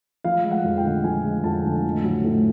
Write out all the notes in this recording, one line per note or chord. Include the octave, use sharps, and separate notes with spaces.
F3 F5
G#3
F#5
F2
G5
D3
F3 G#5
G#3
F2 A5
D3
A2
F#3
A2